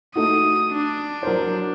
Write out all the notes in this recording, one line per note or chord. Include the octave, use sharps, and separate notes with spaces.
A3 D#4 F#4 D#6
D4
F#3 A#4 C5